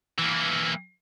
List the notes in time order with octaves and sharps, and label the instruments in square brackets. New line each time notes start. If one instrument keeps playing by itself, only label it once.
[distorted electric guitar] E3 A#3